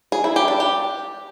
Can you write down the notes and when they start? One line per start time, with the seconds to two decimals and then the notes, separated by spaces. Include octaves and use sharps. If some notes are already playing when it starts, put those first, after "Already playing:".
0.12 G#4
0.24 E4
0.36 G4
0.48 D4
0.60 G4